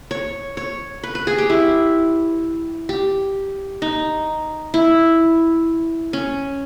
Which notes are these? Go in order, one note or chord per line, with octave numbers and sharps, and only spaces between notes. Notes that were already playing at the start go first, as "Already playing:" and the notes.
C#5
C#5
B4
B4
G#4
G4
E4
G4
D#4
E4
C#4